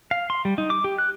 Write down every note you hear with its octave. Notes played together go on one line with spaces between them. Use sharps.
F5
C6
G3
D#4
D6
G4
F#6